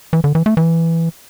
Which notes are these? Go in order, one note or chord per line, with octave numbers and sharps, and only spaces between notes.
E3
D3
E3
A3
E3